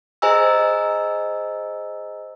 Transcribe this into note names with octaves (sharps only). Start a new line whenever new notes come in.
G#4 C5 D#5 G#5 A#5 E6